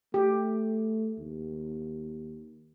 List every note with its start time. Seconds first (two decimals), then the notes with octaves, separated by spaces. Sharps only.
0.14 A3 G4
1.19 D#2